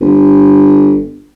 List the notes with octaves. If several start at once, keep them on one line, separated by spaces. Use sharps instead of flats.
G1